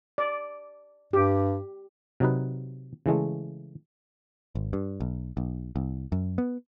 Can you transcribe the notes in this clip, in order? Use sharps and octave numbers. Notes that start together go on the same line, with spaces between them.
D5
G2 G4
C3 F#3 D#4 B4
C#3 E3 G#3 A3
G#1
G2
B1
B1
C2
F#2
B3